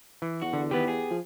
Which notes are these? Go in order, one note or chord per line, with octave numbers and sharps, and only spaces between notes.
E3
E2 F#4
D3
D#3 B3 G4 B4
G#4
F3